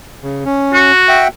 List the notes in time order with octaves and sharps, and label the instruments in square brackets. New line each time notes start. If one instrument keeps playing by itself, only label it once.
[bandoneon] C#3
C#4
[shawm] F#4
[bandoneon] E5 F#5 G5